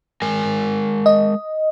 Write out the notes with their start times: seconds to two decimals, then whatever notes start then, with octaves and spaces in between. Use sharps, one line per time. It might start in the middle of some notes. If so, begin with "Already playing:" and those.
0.22 G#3 A#4 G#5
1.06 D#5